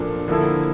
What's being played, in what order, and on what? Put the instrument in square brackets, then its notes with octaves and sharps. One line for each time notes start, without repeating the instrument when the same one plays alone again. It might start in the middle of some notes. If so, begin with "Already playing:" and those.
Already playing: [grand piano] A#2 F3 A#3 D4 A4
D3 F3 A#3 E4 A4